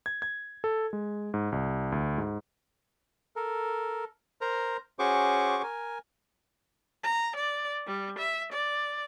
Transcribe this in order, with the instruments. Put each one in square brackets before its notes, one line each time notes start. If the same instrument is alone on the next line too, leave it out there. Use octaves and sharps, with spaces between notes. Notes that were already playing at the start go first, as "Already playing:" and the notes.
[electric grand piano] G#6
G#6
A4
G#3
G#2
C2
D2
G#2
[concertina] A4 A#4
A#4 C5 A#5
C#4 F#4 G#4 C5 C#6 D6
A#4 G#5
[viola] A#5
D5
G3
E5
D5